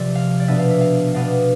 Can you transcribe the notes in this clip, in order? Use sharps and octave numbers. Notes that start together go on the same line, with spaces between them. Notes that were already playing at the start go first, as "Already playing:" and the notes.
Already playing: C3 F3 D5
F5
D5
B2 B3 D4 E5
F5
E5
F5
B2 B3 D4 F5